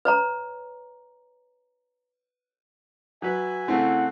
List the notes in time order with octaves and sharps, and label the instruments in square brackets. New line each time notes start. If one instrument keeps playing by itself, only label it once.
[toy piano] B4 C#5 A#5
[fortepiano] F#3 B4 [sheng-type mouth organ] E5 G#5
[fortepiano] C#3 A3 C4 [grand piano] E4 [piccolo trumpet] F#5